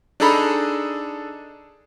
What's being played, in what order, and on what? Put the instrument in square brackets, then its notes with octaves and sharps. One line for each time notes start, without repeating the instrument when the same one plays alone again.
[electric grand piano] D4 D#4 G#4 A4 A#5 B5